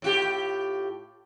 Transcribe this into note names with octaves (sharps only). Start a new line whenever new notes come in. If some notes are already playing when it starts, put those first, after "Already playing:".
A2 F4 G4